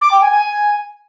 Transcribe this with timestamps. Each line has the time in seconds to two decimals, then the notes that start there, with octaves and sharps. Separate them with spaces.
0.01 D6
0.11 G5
0.21 G#5
0.31 G#5